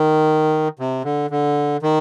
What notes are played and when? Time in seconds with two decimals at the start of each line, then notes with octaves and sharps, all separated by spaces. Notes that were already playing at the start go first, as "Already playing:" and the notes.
Already playing: D#3
0.79 C3
1.04 D3
1.30 D3
1.83 D#3